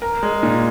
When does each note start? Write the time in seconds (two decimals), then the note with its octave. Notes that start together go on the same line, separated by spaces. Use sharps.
0.02 A#4
0.23 G#3
0.43 A#2